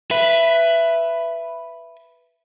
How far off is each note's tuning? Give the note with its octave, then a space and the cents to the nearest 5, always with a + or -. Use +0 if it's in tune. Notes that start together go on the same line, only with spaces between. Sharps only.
B4 +0 E5 +15